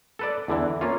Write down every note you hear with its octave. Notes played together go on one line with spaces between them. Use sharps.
A4 B4 D5
E2 D3 E3
A#3 C#4 F4